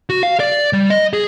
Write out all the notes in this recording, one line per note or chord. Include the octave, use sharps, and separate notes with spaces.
F#4
F5
D5
G3
D#5
G#4